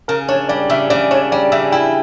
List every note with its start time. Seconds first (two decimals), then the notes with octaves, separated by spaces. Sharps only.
0.08 C#3 A#4
0.28 D4 C#5
0.49 G3 D5
0.70 C#3 E5
0.90 C#3 D5
1.11 D4 C#5
1.31 G3 D5
1.52 C#3 E5
1.72 E4 G5